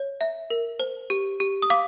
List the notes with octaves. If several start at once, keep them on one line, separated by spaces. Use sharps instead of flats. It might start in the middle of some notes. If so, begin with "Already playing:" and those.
Already playing: C#5
E5
A#4
C5
G4
G4
D#6
F5 D6